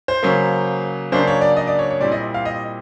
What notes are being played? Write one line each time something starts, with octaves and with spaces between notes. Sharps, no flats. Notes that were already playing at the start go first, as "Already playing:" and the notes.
C5
C#3 F#3 A#3
C#3 F#3 A#3 D4 C5
C#5
D5
D#5
D5
C#5
C#5
A#2 G3 C4 E4 D5
D#5
F5
D#5